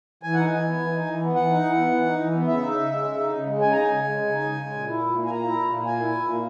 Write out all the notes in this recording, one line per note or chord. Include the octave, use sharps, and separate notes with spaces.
E3 G#5
D#4 F#5
G#5
E3
B3
E3
D#4
E3
B3
E3 F#5
D#4
E3
B3
E3
D#4
E3
B3
C#3 E5
D#4
C#3
G#3
C#3
D#4
C#3
G#3
C#3 G#5
D#4 A#5
G#5
C#3
G#3
C#3
D#4
C#3
G#3
A#2
E4
A#2
A#3
G#5
A#2 A#5
E4
A#2
A#3
A#2 G#5
E4
A#2
A#3